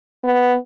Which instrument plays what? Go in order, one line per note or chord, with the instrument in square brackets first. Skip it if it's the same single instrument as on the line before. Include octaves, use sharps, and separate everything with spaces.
[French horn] B3